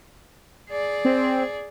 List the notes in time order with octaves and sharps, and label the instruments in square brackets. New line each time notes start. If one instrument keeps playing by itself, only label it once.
[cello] G#4 D5
[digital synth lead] C4